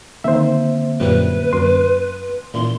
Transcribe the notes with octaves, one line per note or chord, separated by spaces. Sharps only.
D3 D#3 A#3 C4 D#4 C5 E5
F#2 A#2 G3 B4
F#2 C6
A#2 E3 C#4 C6